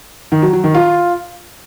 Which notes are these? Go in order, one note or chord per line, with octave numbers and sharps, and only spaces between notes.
D#3
F#3
F#3
D#3
F4